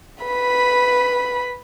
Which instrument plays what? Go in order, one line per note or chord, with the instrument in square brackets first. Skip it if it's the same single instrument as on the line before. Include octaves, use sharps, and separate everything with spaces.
[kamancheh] B4 B5